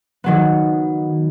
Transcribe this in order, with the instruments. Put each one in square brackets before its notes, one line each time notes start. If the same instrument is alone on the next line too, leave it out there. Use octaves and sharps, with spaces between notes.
[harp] D#3 F#3 B3